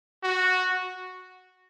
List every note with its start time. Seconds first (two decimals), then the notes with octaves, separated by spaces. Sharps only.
0.24 F#4